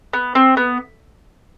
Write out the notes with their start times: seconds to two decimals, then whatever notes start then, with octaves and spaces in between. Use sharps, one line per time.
0.13 B3
0.35 C4
0.57 B3